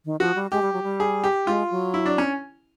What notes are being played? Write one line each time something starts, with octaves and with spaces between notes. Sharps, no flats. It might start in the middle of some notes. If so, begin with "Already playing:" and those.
D#3
F3 F#4
G3
G#3 G4
G3
F#3
G3
G#4
G4
G#3 F4
F#3
E4
D4
C#4